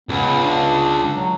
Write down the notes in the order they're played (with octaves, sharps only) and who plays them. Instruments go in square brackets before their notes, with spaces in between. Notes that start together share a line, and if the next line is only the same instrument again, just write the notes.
[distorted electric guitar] C#2 [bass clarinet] B3
[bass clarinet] D4
F#3